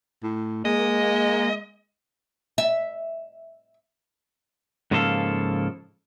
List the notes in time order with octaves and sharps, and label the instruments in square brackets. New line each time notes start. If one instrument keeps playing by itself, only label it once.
[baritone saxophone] A2
[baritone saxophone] G#3 [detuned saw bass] A#3 [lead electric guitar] D#5
[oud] E5
[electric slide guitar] G#2 C#3 F3 A#3 A4 F5